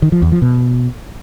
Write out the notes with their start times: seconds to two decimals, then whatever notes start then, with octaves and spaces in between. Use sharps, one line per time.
0.02 D#3
0.12 F3
0.22 E2
0.32 F3
0.42 B2